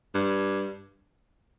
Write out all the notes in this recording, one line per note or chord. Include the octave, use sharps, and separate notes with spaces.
G2